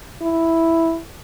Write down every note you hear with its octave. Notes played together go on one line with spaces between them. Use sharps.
E4